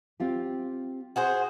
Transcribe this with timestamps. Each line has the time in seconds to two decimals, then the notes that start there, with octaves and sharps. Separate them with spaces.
0.20 C4 F4 G4
1.16 F#4 G#4 C5